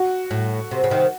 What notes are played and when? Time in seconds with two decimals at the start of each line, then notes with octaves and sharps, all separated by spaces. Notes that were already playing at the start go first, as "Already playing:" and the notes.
Already playing: F#4
0.31 A2
0.71 C3
0.84 C#3
0.90 C3 D#3